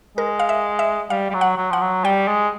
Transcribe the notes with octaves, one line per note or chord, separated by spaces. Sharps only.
G#3 A#4
F5
E5
E5
G3 F5
G3
F#3
F#5
F#3
F3 F#5
F#3
G3 G5
G#3